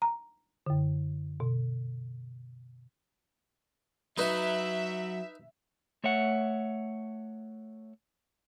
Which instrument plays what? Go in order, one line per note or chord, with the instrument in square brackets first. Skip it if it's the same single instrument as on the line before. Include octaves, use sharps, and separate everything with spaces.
[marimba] A#5
F#2 D3
B2
[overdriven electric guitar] F#3 [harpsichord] D#4 B4 [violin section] E5
[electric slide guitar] A3 C#5 E5 F#5